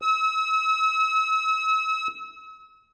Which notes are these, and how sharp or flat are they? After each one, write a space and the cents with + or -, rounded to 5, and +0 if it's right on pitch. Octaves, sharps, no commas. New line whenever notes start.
E6 -40